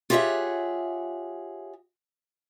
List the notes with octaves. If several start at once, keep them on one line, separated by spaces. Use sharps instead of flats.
F4 G4 G#4 C#5 E5 F#5